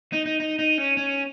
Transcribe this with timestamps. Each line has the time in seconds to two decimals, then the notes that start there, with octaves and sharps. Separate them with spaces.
0.13 D#4
0.26 D#4
0.40 D#4
0.59 D#4
0.78 C#4
0.97 C#4